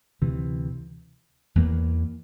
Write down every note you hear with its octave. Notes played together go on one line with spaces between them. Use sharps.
D2 C3 E3
E2 E3 A#3